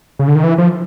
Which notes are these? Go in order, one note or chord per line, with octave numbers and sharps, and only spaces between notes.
C#3
D3
D#3
E3
F3